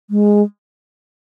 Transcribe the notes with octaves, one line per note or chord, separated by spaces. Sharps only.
G#3